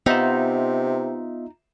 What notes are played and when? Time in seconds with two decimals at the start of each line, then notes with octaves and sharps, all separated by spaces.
0.06 C3 B3 D#4 F4 D#5 E5